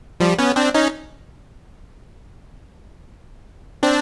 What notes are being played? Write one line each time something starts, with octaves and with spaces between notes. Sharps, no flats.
F3 G3
B3 C#4
C4 D4
C#4 D#4
C4 D4